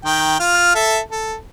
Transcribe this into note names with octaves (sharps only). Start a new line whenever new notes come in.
D#3 G5
F4 F6
A4 E5
A4